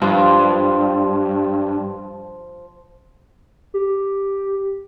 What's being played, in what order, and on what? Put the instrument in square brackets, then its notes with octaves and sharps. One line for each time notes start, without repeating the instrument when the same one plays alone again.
[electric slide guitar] G2 [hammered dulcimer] F3
[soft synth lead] G4